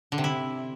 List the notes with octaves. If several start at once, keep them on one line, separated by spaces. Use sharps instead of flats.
D3
C3
E4